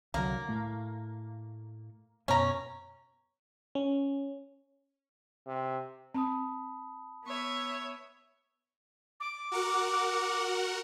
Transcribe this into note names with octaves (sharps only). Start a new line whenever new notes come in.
C2 D3 F#3 A#3
A2 A3
F#2 B2 F#3 C#4 A#5
C#4
C3
C4 A5 B5 D#6
B3 C#5 E5
D6
F#4 A#4 F#5